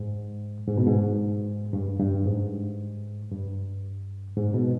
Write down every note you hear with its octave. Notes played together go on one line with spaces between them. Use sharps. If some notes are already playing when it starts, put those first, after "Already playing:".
Already playing: G#2
G#2
B2
G#2
G2
G2
G#2
G2
G#2
B2